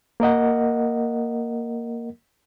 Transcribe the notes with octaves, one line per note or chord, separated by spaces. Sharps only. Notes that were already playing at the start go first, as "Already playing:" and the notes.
A#3 A#4 D#5 F#5